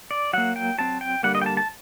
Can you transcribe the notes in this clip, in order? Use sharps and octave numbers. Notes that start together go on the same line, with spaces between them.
D5
F#3 A#3 F#5
G5
F#3 C4 A5
G5
D3 G3 A#3 F#5
D#5
G5
A5
A5